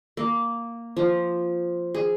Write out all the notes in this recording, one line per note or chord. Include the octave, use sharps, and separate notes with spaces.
A#3
F3
G#4